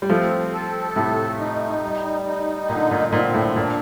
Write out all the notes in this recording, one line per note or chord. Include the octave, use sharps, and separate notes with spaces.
G3
F3 A3 C4
A4
A2 C3 A3
D#4
G3
D#4
A#2 D3
A#2
A#2 C4
A2
A#2 D4